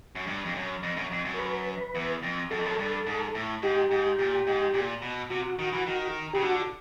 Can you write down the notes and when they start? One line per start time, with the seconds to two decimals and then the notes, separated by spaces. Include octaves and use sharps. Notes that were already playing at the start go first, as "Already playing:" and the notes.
0.15 F#2
0.27 G2
0.45 F2
0.55 F#2
0.83 F2
0.97 F#2
1.11 F2
1.25 F#2
1.34 A#4
1.39 B4
1.95 E2
2.23 F2
2.51 F#2 A4
2.58 F2
2.65 F#2
2.78 G2
3.06 G#2
3.35 A2
3.62 G#2 G4
3.91 G#2
4.19 A#2
4.47 G#2
4.74 A#2
5.02 B2
5.30 C3 F#4
5.59 D#3
5.72 E3
5.86 D#3
6.33 C#3 G4
6.42 D3 F#4